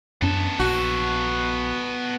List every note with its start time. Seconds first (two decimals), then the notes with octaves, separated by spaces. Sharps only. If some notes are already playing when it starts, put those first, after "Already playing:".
0.22 F#2 B3 C#4 D4 A4
0.59 A#1 F#4